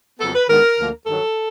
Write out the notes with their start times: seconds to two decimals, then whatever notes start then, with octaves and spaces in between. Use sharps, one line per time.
0.20 F2 C#3 F#3 B3 A4
0.34 B4
0.48 G#2 D#3 G#3 B3 D4 A#4
0.78 D2 D3 F3 A#3
1.06 G2 D#3 F#3 A4